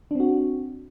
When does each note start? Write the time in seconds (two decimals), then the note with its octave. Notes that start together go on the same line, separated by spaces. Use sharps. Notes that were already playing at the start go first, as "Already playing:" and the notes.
0.11 D4
0.15 C4
0.20 F#4